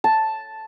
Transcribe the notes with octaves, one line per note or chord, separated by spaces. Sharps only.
A5